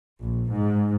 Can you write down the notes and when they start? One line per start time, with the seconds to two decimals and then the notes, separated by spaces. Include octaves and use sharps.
0.22 A#1
0.51 G#2